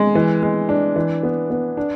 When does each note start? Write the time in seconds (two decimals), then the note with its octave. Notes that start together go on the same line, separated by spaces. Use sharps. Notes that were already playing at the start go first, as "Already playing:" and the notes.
Already playing: G#3
0.15 E3
0.43 G#3
0.69 D4
0.96 E3
1.23 B3
1.50 B3
1.77 D4